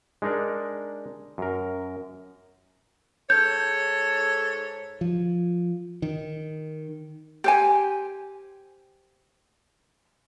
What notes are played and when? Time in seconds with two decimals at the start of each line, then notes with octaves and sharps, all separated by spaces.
0.22 G#3 D4 D#4 A#4 D5
1.38 F#2 A#4
3.30 G#2 A4 C#5 G6
5.01 F3
6.02 D#3
7.44 G4 C5 G#5